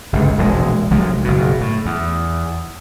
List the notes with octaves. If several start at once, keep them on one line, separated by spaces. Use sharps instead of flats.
G1 C#2
E1 A#1 B2 G#3
C2 F3 F#3 G#3
F#1 B2
A2
E2